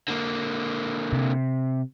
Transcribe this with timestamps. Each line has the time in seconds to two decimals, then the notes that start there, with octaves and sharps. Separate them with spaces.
0.08 D3 A#3
1.13 C3